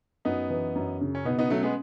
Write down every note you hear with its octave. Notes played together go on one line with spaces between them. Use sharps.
F#2 B3 D#4
E3
F#2
C#3
C#4
B2 B3 D#4
B3 D#4
F#3 A3 C#4
G#3 B3